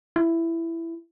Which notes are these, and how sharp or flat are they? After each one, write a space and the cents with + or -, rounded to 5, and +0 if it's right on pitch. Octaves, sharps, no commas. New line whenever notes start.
E4 +10